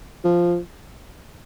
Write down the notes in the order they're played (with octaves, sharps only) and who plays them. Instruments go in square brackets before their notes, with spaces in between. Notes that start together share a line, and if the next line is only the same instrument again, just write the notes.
[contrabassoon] F3